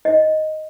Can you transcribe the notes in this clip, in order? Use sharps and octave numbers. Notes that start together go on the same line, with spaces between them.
D#5